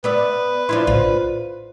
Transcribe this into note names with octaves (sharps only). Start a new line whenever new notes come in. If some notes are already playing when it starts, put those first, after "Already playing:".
B3 B4 D5 E5
F3 D4 E4 C6 G#6
A#1 A2 F4